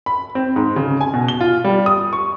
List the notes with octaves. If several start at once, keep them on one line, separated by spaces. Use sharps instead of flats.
B5
C4
G#2
C#3
G#5
B2
G7
F4
G3
D#6
C#6